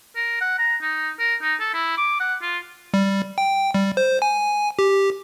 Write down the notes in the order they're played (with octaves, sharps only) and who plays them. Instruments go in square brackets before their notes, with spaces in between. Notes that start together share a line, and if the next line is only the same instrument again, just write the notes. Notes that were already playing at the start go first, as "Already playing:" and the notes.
[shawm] A#4
F#5
A#5
D#4
A#4
D#4
A4
E4
D6
F#5
F4
[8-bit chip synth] G3
G5
G3
C5
G#5
G4